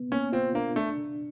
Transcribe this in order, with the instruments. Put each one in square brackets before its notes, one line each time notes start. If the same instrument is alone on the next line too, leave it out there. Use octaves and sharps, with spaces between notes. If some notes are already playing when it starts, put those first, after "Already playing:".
Already playing: [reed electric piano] B3
[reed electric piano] A#3 [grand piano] C#4
[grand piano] C4 [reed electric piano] F4
[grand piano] A#3 [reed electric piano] D4
[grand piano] A3 [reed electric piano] D4